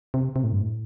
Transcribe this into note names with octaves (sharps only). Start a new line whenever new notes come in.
C3
C3
A2
G2
A2